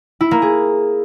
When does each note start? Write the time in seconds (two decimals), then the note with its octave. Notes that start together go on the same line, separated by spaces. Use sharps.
0.21 E4
0.31 A#3
0.42 G#4